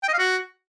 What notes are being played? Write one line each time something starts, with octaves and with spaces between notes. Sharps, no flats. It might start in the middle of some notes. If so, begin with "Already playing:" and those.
G5
D#5
F5
F#4